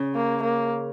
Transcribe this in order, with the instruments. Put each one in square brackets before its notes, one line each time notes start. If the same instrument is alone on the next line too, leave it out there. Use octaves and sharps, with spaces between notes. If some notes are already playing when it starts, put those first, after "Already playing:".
Already playing: [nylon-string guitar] C#3
[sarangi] A#3
A#3